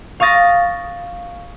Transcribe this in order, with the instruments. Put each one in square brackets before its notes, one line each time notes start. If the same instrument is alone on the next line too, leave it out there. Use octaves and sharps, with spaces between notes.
[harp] F5 C#6 D#6 A6 A#6